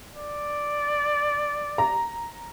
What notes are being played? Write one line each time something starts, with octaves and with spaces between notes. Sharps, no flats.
D5
A#5